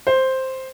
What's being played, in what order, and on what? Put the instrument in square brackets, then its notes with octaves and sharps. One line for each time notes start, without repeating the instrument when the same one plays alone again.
[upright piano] C5